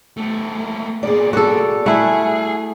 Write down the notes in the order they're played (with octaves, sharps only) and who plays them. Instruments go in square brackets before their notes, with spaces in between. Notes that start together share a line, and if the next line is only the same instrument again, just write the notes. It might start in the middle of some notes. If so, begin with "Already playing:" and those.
[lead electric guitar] A3 B3
[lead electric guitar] B2 A#3 [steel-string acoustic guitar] G#4 D5
[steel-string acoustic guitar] B3 G#4 D5 [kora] F#4 A4
[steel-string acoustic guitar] G3 F#5 [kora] A3 E4 [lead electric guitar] G#4